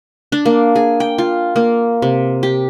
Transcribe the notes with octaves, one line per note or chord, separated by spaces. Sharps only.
D4
A#3
G#4
G5
F4
A#3
C3
G4